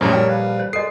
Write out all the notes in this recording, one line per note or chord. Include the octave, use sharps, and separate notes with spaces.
A#1 F#2 A2 G3 A4 A#4 C#5
G3 G5
B4 F5
C5
G#3 A4 A#4 D#5 C7